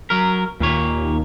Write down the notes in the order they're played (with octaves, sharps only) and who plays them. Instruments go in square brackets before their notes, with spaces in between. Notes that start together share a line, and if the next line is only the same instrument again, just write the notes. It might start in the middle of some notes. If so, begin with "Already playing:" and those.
[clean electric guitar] F#3 A#4
[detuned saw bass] D#2 [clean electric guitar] A#2 A#3 C#5